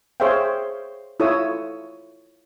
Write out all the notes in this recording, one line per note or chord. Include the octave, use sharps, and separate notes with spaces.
G#4 C5 C#5 E5 F5 G5
E4 F4 A4 C#5 D#6 E6